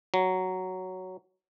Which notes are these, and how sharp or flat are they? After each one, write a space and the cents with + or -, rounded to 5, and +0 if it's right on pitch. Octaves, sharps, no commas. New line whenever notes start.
F#3 +5